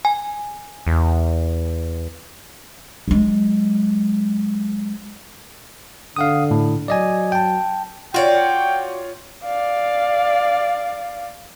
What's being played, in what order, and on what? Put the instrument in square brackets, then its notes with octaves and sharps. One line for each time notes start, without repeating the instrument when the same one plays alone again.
[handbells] G#5
[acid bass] E2
[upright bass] F#3 G#3
[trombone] D3 [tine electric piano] F5 F#5 D#6
[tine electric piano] A2
[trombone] F#3 [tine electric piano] D5 D#5 G#5
[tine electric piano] G5 A5
[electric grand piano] F4 C#5 [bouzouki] F#4 D5 [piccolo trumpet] G5
[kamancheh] D5 F5